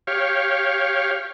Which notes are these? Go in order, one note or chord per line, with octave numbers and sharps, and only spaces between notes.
G4 C#5 F5